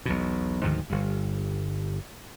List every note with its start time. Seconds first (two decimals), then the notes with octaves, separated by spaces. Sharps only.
0.06 B1 E2 B2
0.63 D2 G#2 D#3 F3
0.90 G1 G2